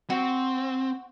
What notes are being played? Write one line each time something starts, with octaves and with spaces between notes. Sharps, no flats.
C4 F#4